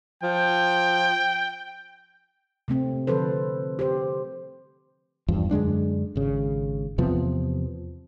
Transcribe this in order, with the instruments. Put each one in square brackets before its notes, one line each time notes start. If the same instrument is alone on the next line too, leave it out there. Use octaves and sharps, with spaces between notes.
[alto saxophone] F3 [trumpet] G5
[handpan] C3 A3 C4
D3 F3 A4 B4 C5
G4 C5
[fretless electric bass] E2 G2 F3
F#2 D3 G#3 D4
G#1 C#3
E2 C3 F3 B3